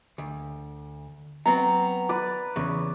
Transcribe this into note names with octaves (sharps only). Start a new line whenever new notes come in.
D2
F#3 B3 C4 A#5
B4 D5
E2 C#3